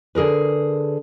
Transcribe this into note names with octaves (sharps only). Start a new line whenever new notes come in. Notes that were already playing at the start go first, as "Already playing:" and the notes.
D3 G#4 A#4 B4